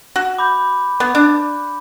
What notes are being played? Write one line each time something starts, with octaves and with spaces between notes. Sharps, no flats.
F#4
B5 D6 G6
B3
D4